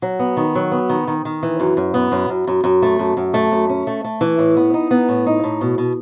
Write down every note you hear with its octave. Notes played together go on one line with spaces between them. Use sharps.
F#3
B3
D#3
F#3
B3
D#3
D#3
D#3
E3
F#2
F#2
B3
F#2
F#2
F#2
F#2
A3
F#2
F#2
A3
F#2
C#4
A3
A3
E3
A2
B3
D#4
B3
A2
D#4
A2
B2
B2